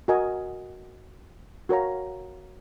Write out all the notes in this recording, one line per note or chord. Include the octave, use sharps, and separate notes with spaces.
F#4 A#4 D#5 G#5
F#4 A#4 C#5 F5 A#5